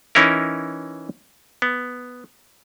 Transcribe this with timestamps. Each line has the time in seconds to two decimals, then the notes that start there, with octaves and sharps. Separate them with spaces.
0.15 E3 C#4 D#4 E4 A#4
1.62 B3